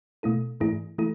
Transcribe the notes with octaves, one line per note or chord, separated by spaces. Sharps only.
B2 A3 E4 A4
G#2 E3 A3 E4 G#4
E3 A3 E4 A4